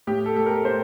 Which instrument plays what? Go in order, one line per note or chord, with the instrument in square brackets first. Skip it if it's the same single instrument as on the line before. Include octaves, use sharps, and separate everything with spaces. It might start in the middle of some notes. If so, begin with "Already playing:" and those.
[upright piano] A2 G4
A4
A3 A4
A#4
A2 C5